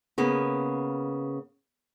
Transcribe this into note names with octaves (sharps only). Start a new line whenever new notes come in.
C#3 A#3 B3